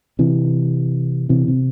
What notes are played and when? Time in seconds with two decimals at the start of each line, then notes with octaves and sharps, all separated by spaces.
0.19 C3 E3
1.29 C3 E3
1.48 C3